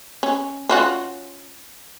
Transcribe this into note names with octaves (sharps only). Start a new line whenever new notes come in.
C#4
C#4 F4 F#4